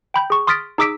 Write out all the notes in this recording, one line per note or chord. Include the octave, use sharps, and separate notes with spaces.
G5 B5 G6
G#4 C#6
C6 D#6 F6 A6 B6 D7
D#4 G#4 D6 E6 B6 D7